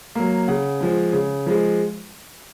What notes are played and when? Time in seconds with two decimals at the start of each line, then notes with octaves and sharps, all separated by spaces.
0.15 F#3 A#3
0.48 C#3 F#5
0.81 F3 G#3
1.13 C#3
1.46 F3 G#3